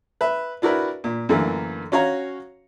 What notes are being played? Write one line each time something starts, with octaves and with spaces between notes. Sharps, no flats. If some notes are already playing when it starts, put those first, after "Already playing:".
B4 E5
D4 E4 F#4 A#4 B4
A#2
F#2 D3 E3 A3 A#3
C#4 F#4 C#5 F5 A#5